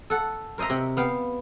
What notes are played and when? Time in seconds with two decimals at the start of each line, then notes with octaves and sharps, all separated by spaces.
0.10 A4 F#5
0.58 A#4 C5 D#5 E5 A#5
0.70 C3 G5
0.97 B3 F5 G5